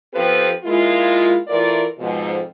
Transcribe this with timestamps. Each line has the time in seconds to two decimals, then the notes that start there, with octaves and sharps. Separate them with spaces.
0.13 F3 B3 C4 G4 A4 B4
0.63 G#3 A#3 E4 F4
1.48 E3 A3 F4 A#4 D5
1.98 F2 G#2 B2